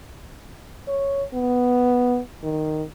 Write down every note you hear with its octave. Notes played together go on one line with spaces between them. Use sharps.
C#5
B3
D#3